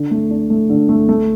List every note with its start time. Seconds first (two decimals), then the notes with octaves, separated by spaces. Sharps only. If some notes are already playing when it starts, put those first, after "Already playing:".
Already playing: D3
0.11 A3
0.31 D4
0.50 A3
0.70 D3
0.89 A3
1.09 A3